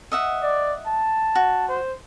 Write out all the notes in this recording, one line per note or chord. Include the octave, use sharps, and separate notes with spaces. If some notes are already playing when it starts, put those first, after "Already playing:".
D#5 E5 F#5
D5
A5
F#4
C5